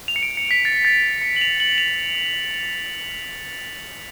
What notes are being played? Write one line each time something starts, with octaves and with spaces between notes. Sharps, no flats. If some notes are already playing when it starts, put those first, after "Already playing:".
F7
C#7
D7
C#7
B6
A6
A6
C#7
F#7
F7
F#7
F7